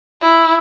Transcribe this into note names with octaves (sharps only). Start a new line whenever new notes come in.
E4